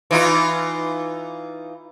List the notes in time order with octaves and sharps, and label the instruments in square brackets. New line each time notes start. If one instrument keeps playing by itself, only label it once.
[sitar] E3 D#4 F4